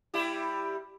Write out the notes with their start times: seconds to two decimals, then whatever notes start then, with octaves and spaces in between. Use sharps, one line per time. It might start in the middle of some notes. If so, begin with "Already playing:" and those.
0.14 G3 E4 G4